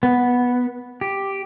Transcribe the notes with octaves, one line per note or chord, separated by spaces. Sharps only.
B3
G4